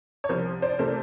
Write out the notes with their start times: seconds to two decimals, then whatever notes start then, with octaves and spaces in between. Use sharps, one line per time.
0.24 C#5
0.29 C2 C3 F3 A#4 C5
0.62 C5 D5
0.79 C3 E3 A3 A#4 C5